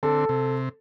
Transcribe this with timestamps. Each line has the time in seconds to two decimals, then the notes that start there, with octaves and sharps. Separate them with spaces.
0.03 D3 C4 A4
0.29 C3